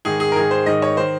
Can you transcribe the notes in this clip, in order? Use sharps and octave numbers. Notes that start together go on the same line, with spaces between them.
G#2 D#3 G#4
G#4
A#4
G#2 D#3 G#4
C5
G#2 D#3 D#5
C#5
D#3 C5